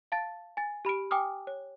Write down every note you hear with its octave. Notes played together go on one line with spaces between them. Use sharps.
F5 A5 A6
G#5 A6
G4 B5 F6 D7
G5 G#5 D6 D#6 F6
C#5